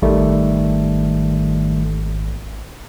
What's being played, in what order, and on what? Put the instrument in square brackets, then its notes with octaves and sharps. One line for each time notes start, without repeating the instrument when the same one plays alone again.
[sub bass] G#1 [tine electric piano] D#3 G3 A3